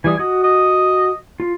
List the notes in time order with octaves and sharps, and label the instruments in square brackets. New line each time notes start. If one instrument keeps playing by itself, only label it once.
[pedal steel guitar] E3 G3 D#6 [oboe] G#5
[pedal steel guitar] F#4 [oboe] D#5
[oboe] D#5
[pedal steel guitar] F4